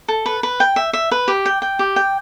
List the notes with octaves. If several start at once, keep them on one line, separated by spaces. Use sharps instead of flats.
A4
B4
B4
G5
E5
E5
B4
G4
G5
G5
G4
G5